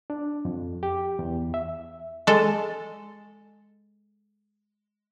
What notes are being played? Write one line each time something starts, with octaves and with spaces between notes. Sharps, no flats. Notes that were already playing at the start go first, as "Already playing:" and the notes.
D4
F2
G4
E2
E5
G#3 A4